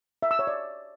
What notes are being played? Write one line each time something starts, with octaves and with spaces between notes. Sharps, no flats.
E5
E6
C#5
D5